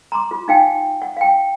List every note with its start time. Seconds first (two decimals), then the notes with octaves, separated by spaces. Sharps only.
0.12 A#5 C6 D6
0.31 F4
0.48 D#4 F5 G5 G#5
1.02 F#5
1.17 F5 G5